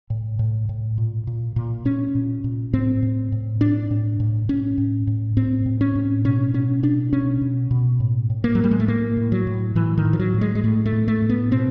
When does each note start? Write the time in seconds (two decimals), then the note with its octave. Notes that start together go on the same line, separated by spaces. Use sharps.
0.10 A2
0.39 A2
0.69 A2
0.98 A#2
1.27 A#2
1.56 A#2
1.85 A#2 C#4
2.15 A#2
2.44 A#2
2.73 A2 C4
3.03 A2
3.32 A2
3.61 A2 D4
3.91 A2
4.20 A2
4.49 A2 C#4
4.78 A2
5.07 A2
5.37 A2 C4
5.66 A2
5.81 C#4
5.95 A2
6.25 B2 C#4
6.54 B2 C#4
6.83 B2 D4
7.13 B2 C#4
7.41 B2
7.71 B2
8.00 A2
8.30 A2
8.44 A#3
8.55 F#3
8.58 A2
8.64 G3
8.71 G#3
8.80 A3
8.88 A2 A#3
9.17 A2
9.32 F#3
9.47 A2
9.75 A2 E3
9.98 D#3
10.05 A2
10.13 F3
10.20 F#3
10.34 A2
10.41 G#3
10.55 G#3
10.63 A2 A3
10.86 A3
10.93 A2
11.08 A3
11.22 A2
11.29 B3
11.51 B2 C4